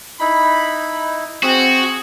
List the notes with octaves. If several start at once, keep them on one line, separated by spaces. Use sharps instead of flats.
D#4 E4 B5
C4 F#4 G#4